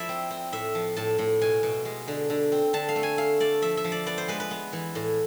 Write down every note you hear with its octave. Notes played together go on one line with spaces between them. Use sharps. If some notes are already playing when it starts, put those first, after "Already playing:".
Already playing: F3 E4 D5 E5
C4
C4
A2 E5
F3
A2 A5
A2
B2 G#5
B2
G#3
D3
D3
C4
D3 A5
F5
A3
G#5
A3 F5
A3 D5
F3 E5
E5
F3
D5
B3 D5
C5
G#3 B4
B4
B3
E3
A2